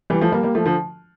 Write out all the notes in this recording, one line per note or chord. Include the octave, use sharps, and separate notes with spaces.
E3 G3
F3 A3
G3 A#3
G3 A#3
F3 A3
D3 F3